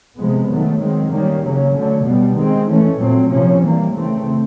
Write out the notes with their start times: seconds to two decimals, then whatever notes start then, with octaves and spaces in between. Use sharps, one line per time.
0.18 C3 F3 G#3 B3
0.50 D#3 F#3 A3
0.81 D#3 G#3 C4
1.12 D#3 G3 A#3 C#4
1.43 C#3 F#3 A#3 C#4
1.75 D3 F#3 A3
2.06 B2 G3 B3
2.38 D#3 G#3 C4
2.69 E3 A3 C#4
3.01 A#2 F#3 A3 C4
3.32 C3 F3 A#3 C#4
3.63 E3 G3 A#3
3.94 C#3 E3 A3 C4